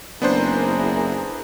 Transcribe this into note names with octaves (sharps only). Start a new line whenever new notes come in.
F#1 B3 D4 E4 G#4 A#4 C5